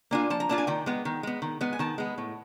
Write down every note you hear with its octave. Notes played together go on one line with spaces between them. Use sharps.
A#3 D4 F4 G#5
F3 A5
A#5
A#3 D4 F4 A5
G#5
D#3 G5
G#3 B3
D#3
G#3 B3
D#3
G#3 B3
G#5
D#3 A5
G#3 B3
A2